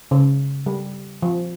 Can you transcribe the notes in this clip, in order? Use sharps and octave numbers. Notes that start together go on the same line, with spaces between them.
C#3
G3
F3